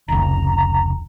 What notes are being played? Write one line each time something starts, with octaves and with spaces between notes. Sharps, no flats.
F1 C#2 A#5